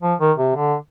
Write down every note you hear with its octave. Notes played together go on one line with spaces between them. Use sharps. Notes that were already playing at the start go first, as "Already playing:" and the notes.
F3
D#3
C3
D3